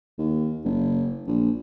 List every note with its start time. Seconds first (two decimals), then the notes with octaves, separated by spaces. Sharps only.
0.18 D#2
0.64 F#1
1.27 A#1